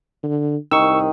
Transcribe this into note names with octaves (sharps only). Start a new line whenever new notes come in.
D3
C2 D#3 C#6 E6